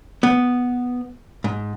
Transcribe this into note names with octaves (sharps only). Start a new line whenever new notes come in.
B3
G#2